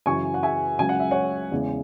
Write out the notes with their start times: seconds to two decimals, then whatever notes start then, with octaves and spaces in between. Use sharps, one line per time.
0.06 F#2 C#3 E3 G#5 C#6
0.34 F#5
0.43 E5 G#5
0.79 C#2 C#3 F#3 G#5
0.89 F#5
1.00 E5
1.11 C#5 F#5
1.51 E2 C#3 E3 G#3